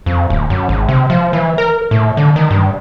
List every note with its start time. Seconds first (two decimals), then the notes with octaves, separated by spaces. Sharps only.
0.06 F2
0.30 D1
0.50 F#2
0.69 G#1
0.89 C3
1.10 F3
1.33 E3
1.58 A#4
1.91 A2
2.17 D3
2.36 D#3
2.51 G2